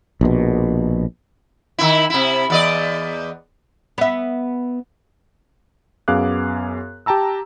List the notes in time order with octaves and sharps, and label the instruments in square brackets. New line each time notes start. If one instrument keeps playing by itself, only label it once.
[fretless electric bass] A#1 B2
[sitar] D#3 E4
C3 E4
E2 D5 D#5
[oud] B3 E5
[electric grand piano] F#2 B3 G#4 F5 D6 F#6
G4 G5 A5 A#5 E6